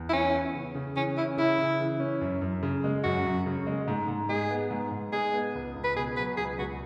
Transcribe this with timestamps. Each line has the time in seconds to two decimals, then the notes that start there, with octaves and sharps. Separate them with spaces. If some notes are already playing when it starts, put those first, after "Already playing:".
Already playing: E2
0.09 E4
0.13 E3 C#4
0.34 B3
0.55 C#3
0.75 C#3
0.96 E3 C#4
1.17 C#4 E4
1.37 C#3 E4
1.58 C#3
1.80 E3
2.00 C#4
2.21 F#2
2.41 F#2
2.63 C#3
2.84 G#3
3.04 F#2 F#4
3.26 F#2
3.46 C#3
3.67 G#3
3.88 G#2
4.08 G#2
4.29 G#3 G#4
4.50 B3
4.71 G#2
4.91 G#2
5.13 G#3 G#4
5.33 B3
5.55 C#2
5.76 C#2
5.84 B4
5.96 B2 G#4
6.17 F#3 B4
6.37 C#2 G#4
6.58 C#2 F#4